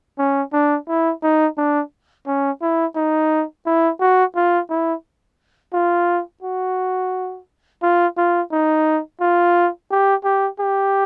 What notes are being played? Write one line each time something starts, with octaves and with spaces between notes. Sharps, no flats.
C#4
D4
E4
D#4
D4
C#4
E4
D#4
E4
F#4
F4
E4
F4
F#4
F4
F4
D#4
F4
G4
G4
G4